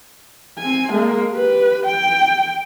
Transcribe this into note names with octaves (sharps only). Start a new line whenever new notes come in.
C4 G#5
G#3 A#3
G4 B4
G5